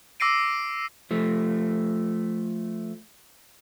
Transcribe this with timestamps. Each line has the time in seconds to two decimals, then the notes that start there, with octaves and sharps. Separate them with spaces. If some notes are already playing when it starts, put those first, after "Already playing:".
0.20 D6 E6 A#6 C7 D7 D#7
1.11 F3 A3